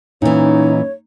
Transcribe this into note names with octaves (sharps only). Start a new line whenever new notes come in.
A#2 E3 C#4 D#4 C#5